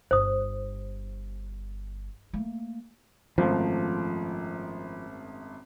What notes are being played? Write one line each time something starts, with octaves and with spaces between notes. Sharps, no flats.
G1 C5 D#6
A3 A#3
G#1 F#2 F3 A3